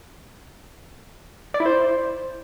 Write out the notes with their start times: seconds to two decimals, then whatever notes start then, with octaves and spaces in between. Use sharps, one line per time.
1.54 D5
1.60 E4
1.66 C5